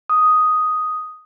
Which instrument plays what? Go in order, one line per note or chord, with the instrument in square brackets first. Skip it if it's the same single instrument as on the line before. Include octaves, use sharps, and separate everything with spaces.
[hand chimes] D#6